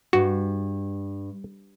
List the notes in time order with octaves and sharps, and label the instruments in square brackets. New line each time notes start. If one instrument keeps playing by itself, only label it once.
[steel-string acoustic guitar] G2 [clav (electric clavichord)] F#4